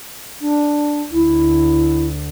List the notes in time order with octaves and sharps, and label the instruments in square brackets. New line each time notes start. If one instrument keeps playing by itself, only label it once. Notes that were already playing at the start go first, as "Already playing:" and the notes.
[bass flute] D4
[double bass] D2 [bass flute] E4